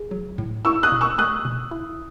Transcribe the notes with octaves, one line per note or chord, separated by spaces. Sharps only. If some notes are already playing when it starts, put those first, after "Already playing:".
Already playing: G#4
F#3
A2
E4 C#6 E6
D#6 F#6
B2
C#6 E6
A3 D#6 F#6
B2
E4